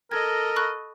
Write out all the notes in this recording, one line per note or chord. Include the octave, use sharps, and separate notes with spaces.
A4 A#4 D#5 G#6
B5 C#6 F#6